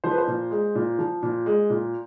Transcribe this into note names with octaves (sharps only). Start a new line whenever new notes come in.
F3 C5
B4
C5
A#2
G#3
A#2
F3
A#2
G#3
A#2